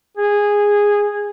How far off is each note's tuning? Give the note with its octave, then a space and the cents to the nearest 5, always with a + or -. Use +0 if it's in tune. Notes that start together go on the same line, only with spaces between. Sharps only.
G#4 -10